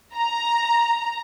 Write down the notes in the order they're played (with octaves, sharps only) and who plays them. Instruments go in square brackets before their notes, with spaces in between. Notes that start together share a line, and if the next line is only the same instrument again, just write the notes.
[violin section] A#5